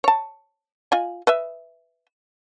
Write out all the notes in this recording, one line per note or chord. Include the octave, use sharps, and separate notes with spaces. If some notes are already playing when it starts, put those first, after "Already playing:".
C#5 A5
F4 D#5 G#5
B4 D#5 E5